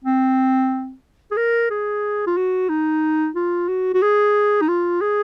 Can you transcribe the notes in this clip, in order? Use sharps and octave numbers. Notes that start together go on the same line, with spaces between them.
C4
G#4
A#4
G#4
F4
F#4
D#4
F4
F#4
F#4
G#4
D#4
F4
G#4